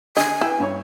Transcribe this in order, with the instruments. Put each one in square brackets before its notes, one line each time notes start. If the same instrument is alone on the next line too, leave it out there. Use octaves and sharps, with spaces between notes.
[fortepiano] D3 [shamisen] D#5 [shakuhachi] G#5
[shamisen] E4 [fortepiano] B4 G5 E6
[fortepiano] G2 C#5 C#6